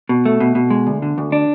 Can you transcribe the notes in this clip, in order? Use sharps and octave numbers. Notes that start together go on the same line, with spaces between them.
B2
A3
B2
B2
G#3
D2
D3
D2
D4